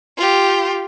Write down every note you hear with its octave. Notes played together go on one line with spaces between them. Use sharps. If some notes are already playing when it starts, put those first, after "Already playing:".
F4 G4